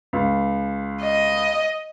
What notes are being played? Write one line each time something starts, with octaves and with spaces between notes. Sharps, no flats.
C#2
D#5